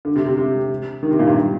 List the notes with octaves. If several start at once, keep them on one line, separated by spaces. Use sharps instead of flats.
D3
C3
C3
C3
D#3
C3
A#2
G2